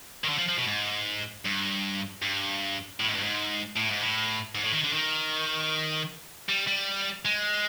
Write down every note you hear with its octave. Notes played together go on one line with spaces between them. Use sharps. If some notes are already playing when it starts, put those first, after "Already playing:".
D#3
D3
F3
F3
B2
G#2
G2
G2
A2
G#2
G2
G#2
A2
G#2
A2
G#2
A2
D#3
D3
D#3
G3
G3
G#3